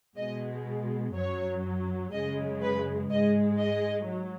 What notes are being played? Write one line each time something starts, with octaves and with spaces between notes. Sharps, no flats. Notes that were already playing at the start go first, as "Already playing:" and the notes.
B2 G#3 D#5
F#2 F#3 C#5
F#2 C#3 G#3 D#5
B4
G#2 G#3 D#5
D#5
F#3